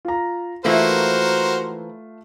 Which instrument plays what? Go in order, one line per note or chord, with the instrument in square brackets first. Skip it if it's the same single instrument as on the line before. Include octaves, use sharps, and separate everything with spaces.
[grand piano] F4 A#5
[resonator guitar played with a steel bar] E3 F3 A#3 [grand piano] A3 F4 [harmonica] F#4 A#4 C5